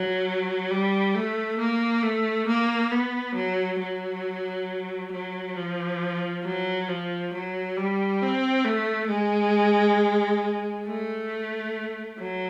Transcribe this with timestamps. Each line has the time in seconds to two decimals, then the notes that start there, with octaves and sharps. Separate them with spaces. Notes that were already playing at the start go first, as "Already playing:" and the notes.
Already playing: F#3
0.71 G3
1.15 A3
1.59 A#3
2.03 A3
2.47 A#3
2.92 B3
3.35 F#3
3.80 F#3
5.12 F#3
5.57 F3
6.44 F#3
6.88 F3
7.34 F#3
7.77 G3
8.22 C4
8.65 A3
9.10 G#3
10.86 A3
12.19 F#3